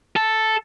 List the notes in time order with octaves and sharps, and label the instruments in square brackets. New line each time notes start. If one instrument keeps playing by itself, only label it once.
[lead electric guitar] A4